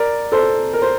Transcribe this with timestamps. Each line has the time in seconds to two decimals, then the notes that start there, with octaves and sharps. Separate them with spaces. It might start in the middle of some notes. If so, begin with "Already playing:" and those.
Already playing: A#4 D5
0.32 A4 C5
0.73 A#4
0.82 C5